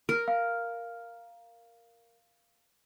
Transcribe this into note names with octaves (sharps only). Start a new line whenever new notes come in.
A#4
F5